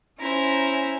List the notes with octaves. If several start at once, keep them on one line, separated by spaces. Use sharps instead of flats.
C#4 E4 C5 A#5